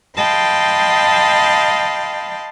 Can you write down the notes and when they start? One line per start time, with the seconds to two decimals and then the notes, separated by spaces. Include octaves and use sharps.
0.17 D#5 F5 G5 A5 B5 C6